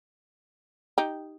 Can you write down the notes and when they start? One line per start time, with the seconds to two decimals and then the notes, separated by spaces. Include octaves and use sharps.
0.98 D#4 G4